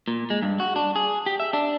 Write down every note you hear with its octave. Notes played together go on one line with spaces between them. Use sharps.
A#2
G#3
G2
F#4
D4
G#4
G4
E5
D4